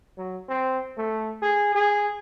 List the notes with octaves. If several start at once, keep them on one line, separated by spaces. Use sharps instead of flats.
F#3
C4
A3
G#4
G#4